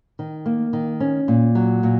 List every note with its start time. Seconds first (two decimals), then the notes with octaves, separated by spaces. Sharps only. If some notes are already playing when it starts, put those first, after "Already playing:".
0.19 D#3
0.46 A#3
0.73 D#3
1.00 C#4
1.28 A#2
1.55 F#3
1.83 A#2